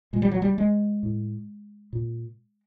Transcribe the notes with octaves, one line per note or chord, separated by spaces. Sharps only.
A#2 G#3
G3
F#3
G3
G#3
A2
A#2